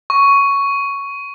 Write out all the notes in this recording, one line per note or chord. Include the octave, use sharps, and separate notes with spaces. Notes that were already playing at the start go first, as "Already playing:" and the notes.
C#6